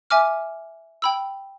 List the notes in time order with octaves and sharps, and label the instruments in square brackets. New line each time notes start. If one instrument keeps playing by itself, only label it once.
[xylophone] E5 G#5 D6 F6
G5 B5 E6